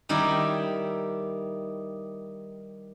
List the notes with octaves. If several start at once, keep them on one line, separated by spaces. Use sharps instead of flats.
D#3 G3 D#4 E4 G4